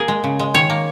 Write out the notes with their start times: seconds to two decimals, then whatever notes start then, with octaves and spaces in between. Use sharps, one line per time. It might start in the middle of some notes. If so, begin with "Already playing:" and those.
Already playing: A#3 G#4 A#4
0.08 G#3
0.24 C#3
0.39 G#3
0.54 D#3 C#5
0.70 A#3